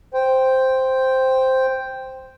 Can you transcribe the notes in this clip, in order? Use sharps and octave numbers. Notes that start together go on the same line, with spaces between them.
C5 G5